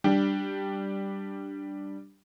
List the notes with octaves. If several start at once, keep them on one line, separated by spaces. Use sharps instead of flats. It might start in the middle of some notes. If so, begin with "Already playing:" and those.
G3 D4 G4